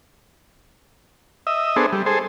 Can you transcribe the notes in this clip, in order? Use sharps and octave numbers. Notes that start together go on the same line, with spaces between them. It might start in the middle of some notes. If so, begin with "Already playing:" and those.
D#5 E5
B3 D4 G#4 A4 C5
G3
G#4 A4 C5